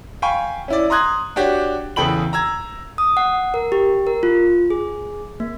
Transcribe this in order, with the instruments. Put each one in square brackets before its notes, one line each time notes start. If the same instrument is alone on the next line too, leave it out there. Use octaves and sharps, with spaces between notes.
[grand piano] F5 G5 G#5 B5 C#6
C#4 E4 D5
A#5 C6 D#6 F#6 G#6
D4 F#4 G4 C#5
E2 C#3 A4 G5 B5 F#7
A#5 E6 G#6
[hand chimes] D#6
F#5
A#4
G4
A#4
F4
G#4
A#3